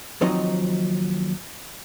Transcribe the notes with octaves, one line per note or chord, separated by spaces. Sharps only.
D#2 F3 F#3 C4 D#4 D#5